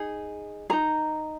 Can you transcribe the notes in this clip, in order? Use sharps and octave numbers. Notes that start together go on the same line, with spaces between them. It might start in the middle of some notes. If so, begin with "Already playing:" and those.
Already playing: D#4 G#4
D#4 G#4 A#5